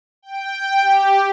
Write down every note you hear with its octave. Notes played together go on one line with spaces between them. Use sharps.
G5
G4